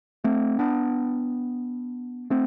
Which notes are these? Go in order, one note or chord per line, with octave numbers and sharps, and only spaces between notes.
A3 C4
B3 D4
A3 C4